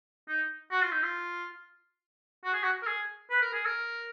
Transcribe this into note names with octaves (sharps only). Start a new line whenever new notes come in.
D#4
F#4
F4
D#4
F4
F#4
G#4
F#4
A#4
G#4
B4
A#4
G#4
A#4